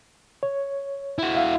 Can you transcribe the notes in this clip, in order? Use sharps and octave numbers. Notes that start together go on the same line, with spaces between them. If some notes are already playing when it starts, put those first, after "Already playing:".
C#5
E4 F#4
E5 F5